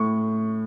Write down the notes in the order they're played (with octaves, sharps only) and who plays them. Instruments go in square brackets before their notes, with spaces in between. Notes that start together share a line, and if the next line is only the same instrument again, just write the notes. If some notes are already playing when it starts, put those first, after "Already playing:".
Already playing: [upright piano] A2 C#6